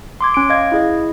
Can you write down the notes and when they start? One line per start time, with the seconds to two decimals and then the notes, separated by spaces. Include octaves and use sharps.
0.21 C6 D6 G#6
0.34 C#4 D7
0.50 D#5 F5 G#6
0.72 E4 G#4 D#5